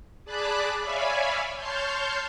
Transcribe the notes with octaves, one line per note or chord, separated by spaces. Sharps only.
G#4 D5 A5 B5 D6 F#6
C#5 D5 E5 F5 G#5 B5
C#5 A5 C6 F6 G6